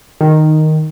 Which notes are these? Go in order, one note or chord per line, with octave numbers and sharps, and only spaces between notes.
D#3